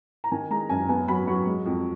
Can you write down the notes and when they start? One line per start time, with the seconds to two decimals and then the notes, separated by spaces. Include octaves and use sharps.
0.24 A#5
0.31 D#3 G#5
0.50 G#3 A#5
0.69 F#2 G#5
0.89 B3 G#5
1.08 F#3 B5
1.27 F#3 C#6
1.47 G#3
1.66 F2